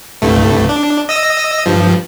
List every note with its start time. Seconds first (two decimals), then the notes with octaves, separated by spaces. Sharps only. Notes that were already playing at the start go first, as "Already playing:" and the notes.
0.22 C2 G2 A3
0.69 D4
1.09 D#5 E6 A#6
1.66 G2 F3